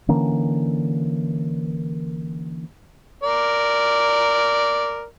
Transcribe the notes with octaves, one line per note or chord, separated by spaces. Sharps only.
D3 E3 A#3 C#4
A#4 D5